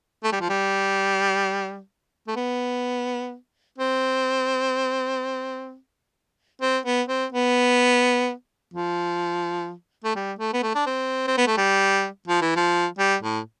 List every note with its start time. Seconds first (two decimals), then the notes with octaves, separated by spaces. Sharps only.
0.24 A3
0.33 G3
0.41 F3
0.49 G3
2.28 A3
2.36 B3
3.78 C4
6.62 C4
6.86 B3
7.09 C4
7.32 B3
8.74 F3
10.04 A3
10.16 G3
10.39 A3
10.53 B3
10.63 A3
10.75 D4
10.87 C4
11.27 C4
11.38 B3
11.47 A3
11.57 G3
12.28 F3
12.42 E3
12.56 F3
12.99 G3
13.23 A2